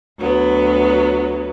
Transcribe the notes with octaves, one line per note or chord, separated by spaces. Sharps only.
D2 F#3 B3